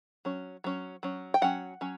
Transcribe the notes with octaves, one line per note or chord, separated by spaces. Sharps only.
F#3 C#4
F#3 C#4
F#3 C#4
G5
F#3 C#4 F#5
F#3 C#4